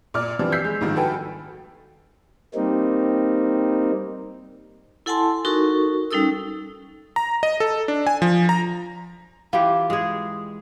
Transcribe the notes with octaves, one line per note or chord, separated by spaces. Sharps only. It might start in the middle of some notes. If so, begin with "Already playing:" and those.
A#2 D5 F6
E3 F3 G3 C4 D4
E6 F6 G6 B6 C7
G#3
G#1 G2 D#3 F3
F#4 A4 B4 G5 G#5
G3 A#3 C4 D#4
E4 A4 F#5 G#5 A5 C6
D#4 F#4 A4 A#4 C#6
G3 C#4 D#4 A4 D#6 E6
A#5
D#5
A4
D4
G#5
F3
A#5
E3 F4 G4
G#3 G#4